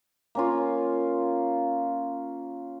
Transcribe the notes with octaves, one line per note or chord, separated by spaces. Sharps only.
A#3 C#4 F4